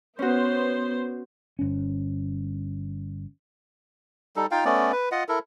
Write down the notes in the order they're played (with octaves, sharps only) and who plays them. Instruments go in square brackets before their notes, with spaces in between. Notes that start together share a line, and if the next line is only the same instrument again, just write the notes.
[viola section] B3 C5 [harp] C#4 F#4
[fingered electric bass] G1 C#4
[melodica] G3 D#4 A4
D#4 F4 F5 G5
A3 B3 C#4 D5
B4
F4 D#5 F#5
E4 A4 A#4